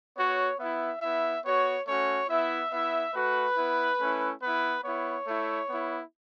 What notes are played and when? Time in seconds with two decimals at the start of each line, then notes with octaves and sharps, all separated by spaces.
0.17 B3 F#4 C#5
0.60 B3 E4 E5
1.02 B3 E4 E5
1.45 B3 F#4 C#5
1.87 A3 C#4 F#4 C#5
2.30 B3 E4 E5
2.72 B3 E4 E5
3.14 A3 F#4 B4
3.57 B3 E4
4.00 A3 C#4 E4
4.42 B3 E4 B4
4.85 B3 E4 C#5
5.27 A3 E4
5.70 B3 E4